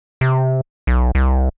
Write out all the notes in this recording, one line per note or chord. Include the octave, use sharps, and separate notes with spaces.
C3
B1
C2